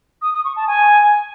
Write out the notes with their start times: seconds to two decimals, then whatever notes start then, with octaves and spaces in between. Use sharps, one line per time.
0.22 D#6
0.33 D#6
0.45 C#6
0.56 A5
0.67 G#5